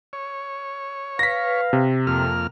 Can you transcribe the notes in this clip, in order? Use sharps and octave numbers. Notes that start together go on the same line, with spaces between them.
C#5
B4 F5 A#6 B6
C3
F2 A#3 A4 F6